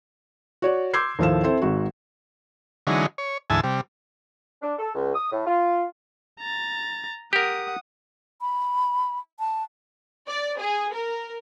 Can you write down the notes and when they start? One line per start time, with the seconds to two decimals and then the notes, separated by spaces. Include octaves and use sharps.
0.62 F#4 C#5 D5
0.94 C6 D6 E6 G6 G#6 C7
1.19 D#2 A2 F3 A4 F5 E7
1.43 C4 E4 A4 C5
1.62 G#1 G#2 F#4
2.87 D3 E3 F#3 G#3 C#4 D#4
3.18 C#5
3.50 D2 G#2 E3 G#5 A5 E6
3.63 C3 G3
4.62 D4
4.79 A4
4.95 C#2
5.14 D#6
5.32 A2
5.46 F4
6.39 A#5 A6
7.33 G4 A#4 F#5 D#6
8.41 B5
9.39 A5
10.28 D5
10.59 G#4
10.92 A#4